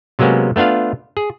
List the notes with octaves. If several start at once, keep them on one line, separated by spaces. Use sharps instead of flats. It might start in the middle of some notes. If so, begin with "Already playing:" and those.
C3 F#3 G#3 A#3 B3 C#4
A3 B3 D4 F4 F5
G#4